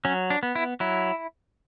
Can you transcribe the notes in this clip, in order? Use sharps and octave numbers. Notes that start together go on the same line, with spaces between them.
F#3 C#4
D4
B3
E4
F#3 E4